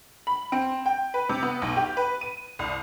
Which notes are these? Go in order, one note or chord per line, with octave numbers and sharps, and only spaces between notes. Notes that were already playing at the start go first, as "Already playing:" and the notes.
B5
C4
G5
B4
C3
B3
B1
G4
B4
D#7
C2